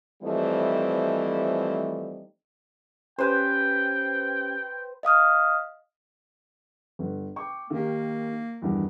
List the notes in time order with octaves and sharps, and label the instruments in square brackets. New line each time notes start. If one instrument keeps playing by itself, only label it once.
[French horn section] E3 F3 G3 A3 C4 D#4
[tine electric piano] C#4 G4 [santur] B4 C5 [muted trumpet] G5
[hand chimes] D#5 F5 D#6 F6
[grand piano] G1
G5 C#6 D6
[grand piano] D#3 G4 [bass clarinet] A#3
[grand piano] E2 G2 D#3